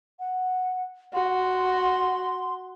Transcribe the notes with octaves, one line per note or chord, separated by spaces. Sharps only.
F#5
F#4 C6